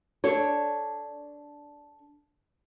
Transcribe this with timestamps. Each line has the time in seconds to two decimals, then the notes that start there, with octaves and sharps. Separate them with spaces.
0.24 D4 A4 C#5